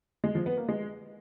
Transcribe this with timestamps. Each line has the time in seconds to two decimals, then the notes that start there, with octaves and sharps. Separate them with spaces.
0.24 G#3
0.35 F3
0.46 B3
0.57 A#3
0.69 G#3